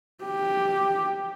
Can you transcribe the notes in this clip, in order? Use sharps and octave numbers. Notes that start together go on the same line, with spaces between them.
G4